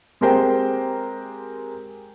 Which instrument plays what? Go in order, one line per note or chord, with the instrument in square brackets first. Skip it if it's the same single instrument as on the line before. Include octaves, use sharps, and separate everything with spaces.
[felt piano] G#3 C4 G4 A#4 C5 G5